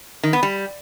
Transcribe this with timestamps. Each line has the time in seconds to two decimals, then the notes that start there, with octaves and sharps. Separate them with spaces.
0.23 D#3
0.33 B3
0.43 G3